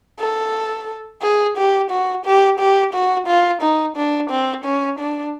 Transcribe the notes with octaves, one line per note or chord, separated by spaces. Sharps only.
A4
G#4
G4
F#4
G4
G4
F#4
F4
D#4
D4
C4
C#4
D4